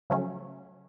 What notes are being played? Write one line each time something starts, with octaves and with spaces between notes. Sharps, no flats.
C#3 F3 F#3 A3 C#4